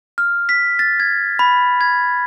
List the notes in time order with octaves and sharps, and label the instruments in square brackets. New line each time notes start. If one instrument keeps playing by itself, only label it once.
[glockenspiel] F6
B6
A6
G#6
B5
G#6